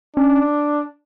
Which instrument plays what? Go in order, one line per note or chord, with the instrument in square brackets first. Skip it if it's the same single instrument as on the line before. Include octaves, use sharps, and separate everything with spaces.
[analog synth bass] C#4 [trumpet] D4